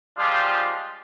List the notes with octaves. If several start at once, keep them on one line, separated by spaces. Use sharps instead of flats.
F3 G3 G#3 D4 F4 G4